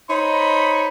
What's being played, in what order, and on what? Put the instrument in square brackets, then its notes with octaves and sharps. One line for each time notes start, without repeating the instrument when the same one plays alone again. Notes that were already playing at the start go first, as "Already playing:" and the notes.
[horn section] D#4 C5 C#5 D#5 B5